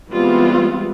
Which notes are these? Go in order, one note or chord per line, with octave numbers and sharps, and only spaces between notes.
E3 G3 G#3 B3 C4 F4